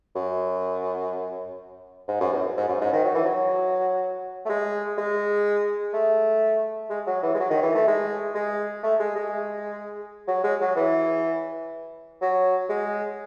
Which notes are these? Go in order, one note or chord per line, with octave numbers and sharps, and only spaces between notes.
F#2
G#2
F#2
E2
G#2
F#2
G#2
D#3
F#3
E3
F#3
A3
G#3
G#3
A3
G#3
F#3
E3
G#3
F#3
D#3
E3
A3
G#3
G#3
A3
G#3
G#3
F#3
G#3
F#3
E3
F#3
G#3